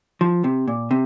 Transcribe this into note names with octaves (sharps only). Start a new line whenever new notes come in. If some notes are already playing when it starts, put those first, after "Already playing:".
F3
C3
A#2
C3